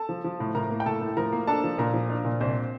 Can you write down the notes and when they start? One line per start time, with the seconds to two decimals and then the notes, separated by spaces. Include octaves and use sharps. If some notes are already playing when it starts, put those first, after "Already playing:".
Already playing: A4 A5
0.09 F3
0.24 F3
0.40 A2
0.55 A2 A#4 A#5
0.70 A#3
0.80 G5
0.86 A2 A4 A5
1.01 A2
1.17 F3 A#4 A#5
1.32 A#3
1.47 D4 A4 A5
1.64 F3
1.78 A#2 A#4 A#5
1.94 F3
2.10 D4
2.25 A#2
2.40 C2 C4 C5